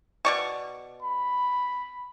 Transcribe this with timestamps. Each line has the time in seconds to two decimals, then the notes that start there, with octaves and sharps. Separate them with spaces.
0.25 B2 D5 C#6
1.03 B5